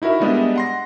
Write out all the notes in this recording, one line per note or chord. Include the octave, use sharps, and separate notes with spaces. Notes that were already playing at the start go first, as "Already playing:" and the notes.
D#4 E4 F#4 A#4 E5
G3 G#3 B3 D4 D#5 E5
F#5 C6 A#6